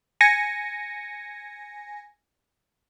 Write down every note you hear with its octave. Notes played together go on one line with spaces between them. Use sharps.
G#5 A#6 C#7